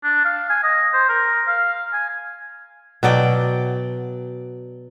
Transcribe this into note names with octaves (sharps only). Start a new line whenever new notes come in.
D4
F5
G#5
D#5
C5
A#4
F5
G#5
B2 F#3 D5 G5